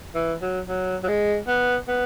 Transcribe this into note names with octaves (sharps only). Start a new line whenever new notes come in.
E3
F#3
F#3
F#3
G#3
B3
B3